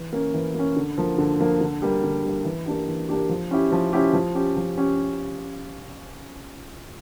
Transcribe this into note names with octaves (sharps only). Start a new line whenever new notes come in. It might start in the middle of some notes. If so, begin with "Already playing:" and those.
Already playing: E3
A#3 C#4
E3
A#3 C#4
D3
F3 A#3
D3
F3 A#3
D3
G3 A#3
D3
G3 A#3
E3
A#3 D4 G4
E3
A#3 D4 G4
F3
C#4 E4 G4
F3
C#4 E4 G4
F3
C#4 G4
F3
C#4 G4